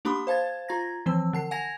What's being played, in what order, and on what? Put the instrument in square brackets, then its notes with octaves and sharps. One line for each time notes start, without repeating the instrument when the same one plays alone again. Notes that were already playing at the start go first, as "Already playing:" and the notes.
[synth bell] A#3 D4 G4 B5 C6 D#6
C5 F5 A5 G#6 A6
F4 A#5 G#6 A#6
E3 F3 C4 E6
D3 A5 C7
F#5 G#5 G#6 A#6 F7